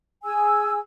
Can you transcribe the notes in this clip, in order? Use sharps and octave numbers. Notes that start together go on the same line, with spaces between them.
G#4 G#5 E6